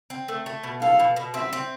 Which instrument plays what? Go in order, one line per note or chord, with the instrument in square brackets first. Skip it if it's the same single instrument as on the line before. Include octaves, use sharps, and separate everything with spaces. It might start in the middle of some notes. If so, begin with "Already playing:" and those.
[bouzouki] C4
A3
A3
B2
[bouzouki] A4 [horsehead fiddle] F5
[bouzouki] B2
B2
[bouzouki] C4 [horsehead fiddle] E5
[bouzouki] C4